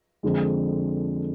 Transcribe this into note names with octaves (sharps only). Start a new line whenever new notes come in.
F2 D3 G#3